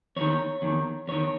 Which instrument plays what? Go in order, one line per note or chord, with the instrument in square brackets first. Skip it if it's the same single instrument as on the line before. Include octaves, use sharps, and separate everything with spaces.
[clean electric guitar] E2 D#3 C#5
E2 D#3
E2 D#3 C#5